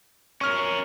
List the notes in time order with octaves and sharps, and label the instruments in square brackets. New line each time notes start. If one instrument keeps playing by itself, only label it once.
[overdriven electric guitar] C#4 A#4 [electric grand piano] C#6 F6